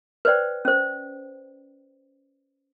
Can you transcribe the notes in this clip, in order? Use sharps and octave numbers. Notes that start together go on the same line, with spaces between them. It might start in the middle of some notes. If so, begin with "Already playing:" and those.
B4 C5 D5 G5
C#4 C5